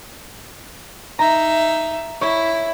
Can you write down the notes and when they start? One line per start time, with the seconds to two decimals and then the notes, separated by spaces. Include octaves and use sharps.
1.19 D#4 E5 A#5
2.21 E4 C#5